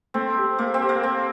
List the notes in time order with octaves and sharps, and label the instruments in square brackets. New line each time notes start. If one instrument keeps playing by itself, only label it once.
[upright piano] A3 [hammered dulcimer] C4
[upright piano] G4
[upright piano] A3 [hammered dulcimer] A#3
[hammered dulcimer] C4
[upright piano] G4
[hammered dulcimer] A#3
[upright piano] A3 [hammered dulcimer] C4